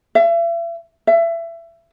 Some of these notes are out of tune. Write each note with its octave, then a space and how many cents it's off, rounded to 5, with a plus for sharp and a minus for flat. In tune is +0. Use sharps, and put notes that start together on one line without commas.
E5 +40
E5 +25